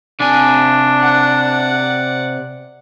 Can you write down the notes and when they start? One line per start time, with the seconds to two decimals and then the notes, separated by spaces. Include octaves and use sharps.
0.21 C3 D4 G#5
0.97 D5 F#5